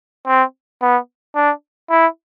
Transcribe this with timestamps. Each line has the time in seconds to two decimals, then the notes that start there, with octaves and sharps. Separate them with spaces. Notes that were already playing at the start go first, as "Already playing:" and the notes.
0.27 C4
0.82 B3
1.35 D4
1.90 E4